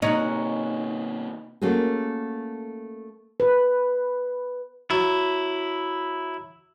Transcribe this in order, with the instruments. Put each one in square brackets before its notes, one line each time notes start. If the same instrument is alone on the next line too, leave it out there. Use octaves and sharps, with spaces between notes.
[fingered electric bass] C3 A#3 [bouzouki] C#4 F#5 [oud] D#4
[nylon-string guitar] A3 A#3 C#4 F#4 G#4
[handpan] B4
[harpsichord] F#3 [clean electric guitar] E4